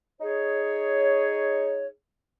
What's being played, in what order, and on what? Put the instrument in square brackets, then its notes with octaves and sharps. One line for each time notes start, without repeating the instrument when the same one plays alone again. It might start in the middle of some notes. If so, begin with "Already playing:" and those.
[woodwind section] D#4 G#4 C#5